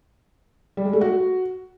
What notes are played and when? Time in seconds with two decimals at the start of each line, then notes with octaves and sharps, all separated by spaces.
0.77 G3
0.85 G#3
0.93 A3
1.01 F#4